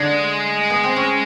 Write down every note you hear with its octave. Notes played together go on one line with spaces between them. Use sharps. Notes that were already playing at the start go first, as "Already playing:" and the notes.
Already playing: D3 G#3 D4
B3
C4
C#4